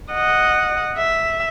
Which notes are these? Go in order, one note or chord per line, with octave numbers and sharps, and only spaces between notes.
D#5 F#5
E5